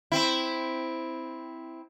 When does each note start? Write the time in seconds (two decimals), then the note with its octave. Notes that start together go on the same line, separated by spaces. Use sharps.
0.12 C4 E4